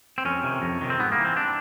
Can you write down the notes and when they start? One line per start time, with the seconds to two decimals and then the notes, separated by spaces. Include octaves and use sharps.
0.18 C4
0.25 F2 C#4
0.43 C3 D#3
0.62 F2
0.81 C3 D#3
0.90 C4
0.99 G#2 B3
1.12 A#3
1.18 E3
1.25 C4
1.37 D4